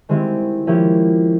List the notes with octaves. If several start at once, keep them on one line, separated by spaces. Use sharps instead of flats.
D#3 G#3 C4 E4 G4
F3 A#3 C#4 E4 G4